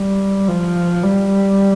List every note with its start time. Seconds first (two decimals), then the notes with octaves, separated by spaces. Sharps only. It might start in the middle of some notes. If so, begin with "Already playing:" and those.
Already playing: G3
0.48 F3
1.03 G3